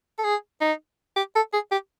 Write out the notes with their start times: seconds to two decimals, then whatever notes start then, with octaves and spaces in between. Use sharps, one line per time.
0.18 A4
0.24 G#4
0.61 D#4
1.16 G4
1.36 A4
1.53 G#4
1.71 G4